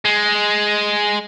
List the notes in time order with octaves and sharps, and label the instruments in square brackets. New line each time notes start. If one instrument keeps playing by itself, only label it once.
[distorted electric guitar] G#3